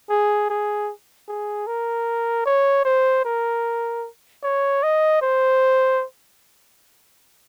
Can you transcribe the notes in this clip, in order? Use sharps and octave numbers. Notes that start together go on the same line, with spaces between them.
G#4
G#4
G#4
A#4
C#5
C5
A#4
C#5
D#5
C5